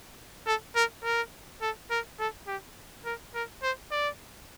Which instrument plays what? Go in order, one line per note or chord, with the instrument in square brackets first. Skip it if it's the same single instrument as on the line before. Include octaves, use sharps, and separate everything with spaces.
[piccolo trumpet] A4
A#4
A#4
A4
A#4
A4
G4
A#4
A#4
C5
D5